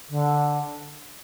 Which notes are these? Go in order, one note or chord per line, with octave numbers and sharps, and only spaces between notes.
D3